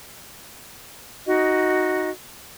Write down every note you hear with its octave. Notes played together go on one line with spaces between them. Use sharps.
D#4 F#4 D#5